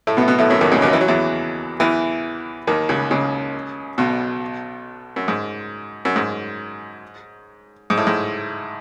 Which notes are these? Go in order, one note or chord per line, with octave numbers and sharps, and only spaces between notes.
A2 A3
B2 B3
A3
B2 B3
A2 A3
F#2 F#3
D#2 D#3
C#2 C#3
D#2 D#3
E3
F#3
E2 E3
E2 E3
D#2 D#3
C#2 C#3
C#2 C#3
B1 B2
F#2
G#2
F#2
G#2
G#2
A2
G#2